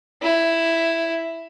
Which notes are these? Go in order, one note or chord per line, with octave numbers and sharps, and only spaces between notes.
E4